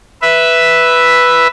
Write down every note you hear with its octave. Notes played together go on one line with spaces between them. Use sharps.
B4 E5